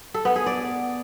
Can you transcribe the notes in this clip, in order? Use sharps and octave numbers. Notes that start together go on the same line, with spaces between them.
A4
B3
G#4
D5